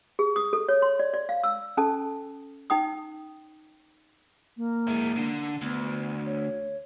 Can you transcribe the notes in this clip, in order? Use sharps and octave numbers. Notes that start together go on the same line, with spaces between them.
G#4
D#6
A4
C#5
C6
D5
D5
F5
E6
C#4 A4 A5
D#4 G5 D#6
A#3
G#3 E4
D3
D2 B3
C#5